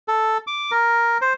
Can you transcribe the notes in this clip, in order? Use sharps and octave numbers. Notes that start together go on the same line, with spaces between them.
A4
D6
A#4
C5